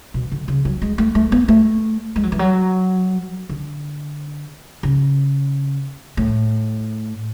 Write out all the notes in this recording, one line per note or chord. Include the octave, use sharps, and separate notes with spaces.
B2
D3
C#3
F#3
G#3
A3
A3
B3
A3
G#3
F#3
E3
F#3
D3
C#3
A2